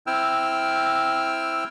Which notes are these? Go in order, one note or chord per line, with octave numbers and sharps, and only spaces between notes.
C4 E4 G5 E6 F6